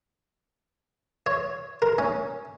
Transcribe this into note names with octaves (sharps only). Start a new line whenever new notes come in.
C#5
A#4
C#4